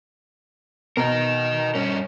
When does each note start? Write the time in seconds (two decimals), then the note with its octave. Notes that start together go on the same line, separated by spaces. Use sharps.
0.97 B2 A#4 D#5 A#5
1.75 G2 C#4